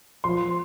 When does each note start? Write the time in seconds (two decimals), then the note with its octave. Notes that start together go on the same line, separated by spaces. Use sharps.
0.24 F3 C6